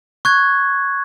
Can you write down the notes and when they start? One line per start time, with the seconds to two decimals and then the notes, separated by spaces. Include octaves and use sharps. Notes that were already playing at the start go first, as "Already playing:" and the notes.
0.25 C#6 F#6 G#6